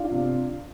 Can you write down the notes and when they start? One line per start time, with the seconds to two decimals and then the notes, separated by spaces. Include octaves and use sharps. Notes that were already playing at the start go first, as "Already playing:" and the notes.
Already playing: D4 F4
0.11 C3